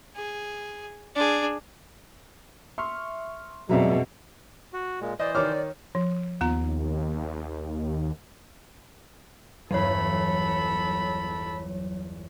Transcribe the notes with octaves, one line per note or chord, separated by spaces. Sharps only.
G#4
D4 G#4
E5 C6 C#6 F6
F2 B2 F#3 G#3 D5 E5 A#5
F#4
A#2 G#3
E3 C5 D5 D#5
D#3 C#5 D5 D6 F6
F3
D#2 B3 F4 A#5
G1 E2 F#3 A4 C#5 B5